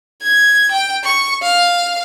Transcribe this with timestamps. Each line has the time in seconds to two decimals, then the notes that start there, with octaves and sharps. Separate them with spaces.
0.22 G#6
0.72 G5
1.04 C#6
1.42 F5